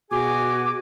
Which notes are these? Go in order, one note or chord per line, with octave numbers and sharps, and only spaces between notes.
B2 F#4 G#4 G#5 D6